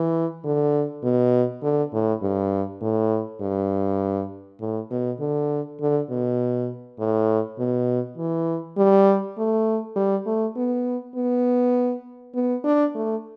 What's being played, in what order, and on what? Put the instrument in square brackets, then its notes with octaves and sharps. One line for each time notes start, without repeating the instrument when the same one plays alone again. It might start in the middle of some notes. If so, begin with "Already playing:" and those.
Already playing: [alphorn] E3
D3
B2
D3
A2
G2
A2
G2
A2
B2
D3
D3
B2
A2
B2
E3
G3
A3
G3
A3
B3
B3
B3
D4
A3